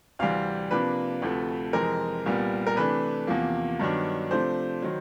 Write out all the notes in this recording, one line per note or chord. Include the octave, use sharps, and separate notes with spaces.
D2 C3 E3 G3 C4 F5
C3 F3 A#3 D4 B4
D2 C3 F3 A3
F2 C3 E3 G#3 C4 A#4
C2 A#2 G3 B3
A#4
C3 E3 A3 D4 B4
E2 C3 F3 A#3
G2 D#3 F#3 B3 D4
C3 F3 A3 D4 C5
D#3 F#3